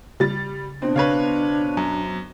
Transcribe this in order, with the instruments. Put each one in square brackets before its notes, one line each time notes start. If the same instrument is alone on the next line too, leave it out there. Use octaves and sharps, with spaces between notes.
[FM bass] C#3 [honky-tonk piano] G3 A6
[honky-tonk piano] B2 C4 [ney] D4
[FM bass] C#3 [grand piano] B4 C#5 F5
[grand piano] F#2 [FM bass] F#3